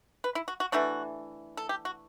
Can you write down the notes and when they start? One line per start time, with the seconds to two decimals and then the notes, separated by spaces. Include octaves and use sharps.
0.24 B4
0.35 E4
0.48 F#4
0.60 F#4
0.72 E3 A3 D4 F#4
1.57 A4
1.69 G4
1.85 F#4